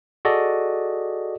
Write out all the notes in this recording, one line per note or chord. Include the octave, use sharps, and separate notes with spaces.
F#4 G#4 A4 D5 D#5